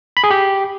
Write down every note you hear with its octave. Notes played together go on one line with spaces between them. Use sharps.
B5
G#4
G4